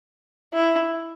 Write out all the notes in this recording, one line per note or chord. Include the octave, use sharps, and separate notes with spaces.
E4